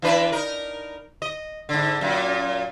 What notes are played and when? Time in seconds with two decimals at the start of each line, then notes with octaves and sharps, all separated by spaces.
0.02 E3 D4 B4
0.32 D#4 A#4
1.22 D#5
1.69 G#2 D3
2.01 F#2 A#2